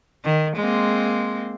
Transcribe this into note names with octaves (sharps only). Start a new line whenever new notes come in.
D#3
G#3 A#3 C4